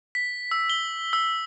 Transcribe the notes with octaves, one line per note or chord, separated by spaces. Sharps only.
B6
E6
G7
E6